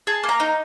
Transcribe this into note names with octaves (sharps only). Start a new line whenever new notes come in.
G#4 A5
A#3
A#5
D#4